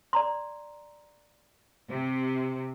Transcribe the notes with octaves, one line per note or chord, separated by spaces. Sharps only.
D5 A#5 C6
C3